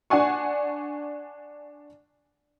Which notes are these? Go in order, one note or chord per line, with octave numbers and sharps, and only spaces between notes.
D4 F#5 G#5 C#6